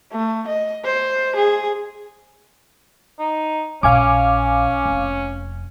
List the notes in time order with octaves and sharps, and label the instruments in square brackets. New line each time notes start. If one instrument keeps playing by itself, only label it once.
[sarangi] A3
D#5
C5
G#4
[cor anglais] D#4
[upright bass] A#1 [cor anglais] C#4 [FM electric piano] F5 G#5 D6
[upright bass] F1